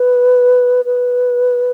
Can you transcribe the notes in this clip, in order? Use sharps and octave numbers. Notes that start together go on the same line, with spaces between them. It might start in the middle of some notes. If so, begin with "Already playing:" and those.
Already playing: B4
B4